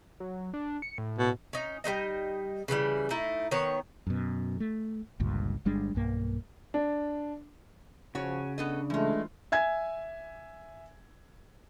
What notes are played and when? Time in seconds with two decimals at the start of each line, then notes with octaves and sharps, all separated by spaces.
0.20 F#3
0.53 D4
0.82 C#7
0.98 A2
1.18 B2
1.53 C#4 D#4
1.84 G3 C4 D#4 D#5
2.68 C#3 E3 F3 G3
3.10 A3 D#4 E4
3.51 D#3 B3 C#5
4.07 F#2 B2
4.60 A3
5.20 G1 C#2 G2 A#2
5.65 G1 G3 G#3 D4
5.95 B1 G2 A#3
6.74 D4
8.15 C#3 F3 F#4 C#5
8.58 B3 D4 A4 D#5
8.90 E3 G#3 A3 F4
9.52 E5 G#5 G#6